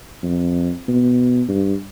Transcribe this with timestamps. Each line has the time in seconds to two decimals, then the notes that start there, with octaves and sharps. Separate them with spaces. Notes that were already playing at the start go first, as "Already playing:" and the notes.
0.23 F2
0.88 B2
1.48 G2